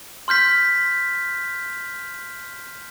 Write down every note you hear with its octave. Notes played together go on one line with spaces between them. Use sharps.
C6 F6 G6 B6